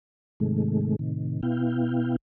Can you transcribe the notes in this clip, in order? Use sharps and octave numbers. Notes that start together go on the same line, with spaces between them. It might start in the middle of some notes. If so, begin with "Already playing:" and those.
G#2 C3 D#3 G#3 A3
A2 C3 D#3
B2 B3 E4 F5 G5